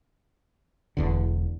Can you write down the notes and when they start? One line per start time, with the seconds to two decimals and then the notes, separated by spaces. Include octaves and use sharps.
0.97 E1 E2 D3